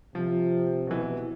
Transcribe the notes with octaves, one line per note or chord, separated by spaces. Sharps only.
C3 F3
B2 E3